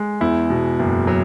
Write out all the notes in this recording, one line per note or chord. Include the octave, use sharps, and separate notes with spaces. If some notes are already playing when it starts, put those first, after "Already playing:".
Already playing: G#3
E2 E4
B2
F#1
F#3